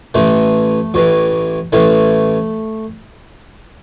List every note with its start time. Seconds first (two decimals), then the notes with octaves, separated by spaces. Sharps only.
0.14 A1 A2 E3 A3
0.94 A1 A2 E3
1.72 A1 A2 E3 A3